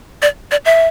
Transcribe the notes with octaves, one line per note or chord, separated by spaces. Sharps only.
D5
D5
E5